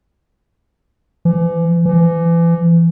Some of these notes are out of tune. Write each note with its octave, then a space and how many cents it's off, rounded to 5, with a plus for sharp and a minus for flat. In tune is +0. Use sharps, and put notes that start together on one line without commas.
E3 +40
E3 +35